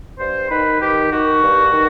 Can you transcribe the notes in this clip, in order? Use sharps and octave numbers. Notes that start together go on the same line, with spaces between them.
G2 C5
D#3 B4
D#3 G4
D#3 F#4
G2
D#3